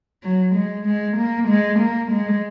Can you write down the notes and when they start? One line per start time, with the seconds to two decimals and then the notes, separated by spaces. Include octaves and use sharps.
0.23 F#3
0.55 G#3
0.86 G#3
1.17 A#3
1.48 G#3
1.79 A#3
2.11 G#3